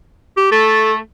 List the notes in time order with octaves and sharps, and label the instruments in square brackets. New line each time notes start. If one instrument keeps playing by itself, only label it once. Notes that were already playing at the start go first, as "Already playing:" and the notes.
[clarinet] G4
[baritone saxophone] A3 [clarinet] A4